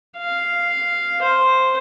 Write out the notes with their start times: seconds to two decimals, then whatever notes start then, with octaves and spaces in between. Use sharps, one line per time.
0.18 F5
1.22 C5